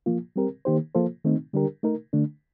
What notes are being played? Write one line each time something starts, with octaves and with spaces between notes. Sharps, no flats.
F3 A#3 F4
G3 C4 G4 A#4
D#3 A#3 D#4 G4 C5
F3 A#3 F4 A4 C5
D#3 A3 C4 D#4
D3 G3 D4 G4 A#4
A3 D#4 A#4
D3 A3 D4